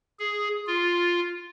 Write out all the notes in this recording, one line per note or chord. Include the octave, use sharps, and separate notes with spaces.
G#4
F4